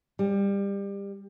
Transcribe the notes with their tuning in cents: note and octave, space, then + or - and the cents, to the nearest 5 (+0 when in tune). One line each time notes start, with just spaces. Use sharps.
G3 +25